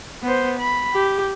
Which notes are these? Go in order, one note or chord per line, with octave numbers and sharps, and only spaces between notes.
B3 C5
B5
G4